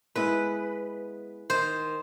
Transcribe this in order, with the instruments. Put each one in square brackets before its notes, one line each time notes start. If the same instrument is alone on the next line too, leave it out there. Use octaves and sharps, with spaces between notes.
[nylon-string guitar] G#3 B3 E4 [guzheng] B4
[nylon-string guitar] D#3 [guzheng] C5